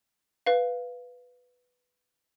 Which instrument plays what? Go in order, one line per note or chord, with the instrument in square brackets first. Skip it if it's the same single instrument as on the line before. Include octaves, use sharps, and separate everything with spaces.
[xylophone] B4 F5